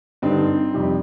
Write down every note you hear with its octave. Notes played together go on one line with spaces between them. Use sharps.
G2 D3 G3 C4 D#4
F2 C3 G3